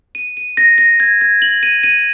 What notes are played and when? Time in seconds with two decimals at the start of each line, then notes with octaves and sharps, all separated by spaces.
0.15 D#7
0.37 D#7
0.57 A#6
0.78 A#6
1.00 G#6
1.21 G#6
1.42 F#7
1.63 D#7
1.83 D#7